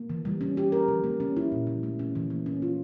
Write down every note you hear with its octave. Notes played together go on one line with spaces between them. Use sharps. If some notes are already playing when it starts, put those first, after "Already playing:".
Already playing: A#3
E3
G3
C#4
G4
A#4
F3
A#3
C#4
E4
A#2
F3
A3
C#4
E3
A#3
C#4
F4